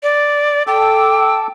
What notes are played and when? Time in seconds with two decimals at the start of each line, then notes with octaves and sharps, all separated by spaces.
0.03 D5
0.67 A4 G5 D6 E6